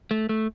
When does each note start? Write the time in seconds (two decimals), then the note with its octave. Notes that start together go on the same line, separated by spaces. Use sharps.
0.11 A3
0.29 A3